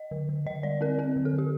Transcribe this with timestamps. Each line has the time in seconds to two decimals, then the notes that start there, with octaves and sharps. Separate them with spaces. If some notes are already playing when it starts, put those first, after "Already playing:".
Already playing: D#5
0.11 D3
0.29 D3
0.46 D3 D#5
0.63 G3 D5
0.81 C4 A#4
0.99 C4 A#4
1.16 D3
1.25 A4
1.33 D3
1.38 G4